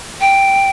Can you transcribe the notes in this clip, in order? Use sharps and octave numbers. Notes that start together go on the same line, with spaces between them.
G5